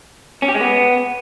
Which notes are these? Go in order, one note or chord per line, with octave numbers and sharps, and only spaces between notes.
C#4
G4
G#3
B3